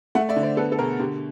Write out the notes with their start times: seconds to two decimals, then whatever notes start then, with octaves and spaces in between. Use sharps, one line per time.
0.15 A3 E5 F#5
0.29 D5 E5
0.36 D3
0.43 C5 D5
0.57 B3 A4 B4
0.72 A4
0.79 B2 G#4 A#4
0.99 D3 G4